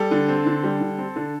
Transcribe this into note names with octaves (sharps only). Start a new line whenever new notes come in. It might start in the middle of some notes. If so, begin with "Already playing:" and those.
Already playing: G3 A4
D3
C4
D3
G3
D3
C4
D3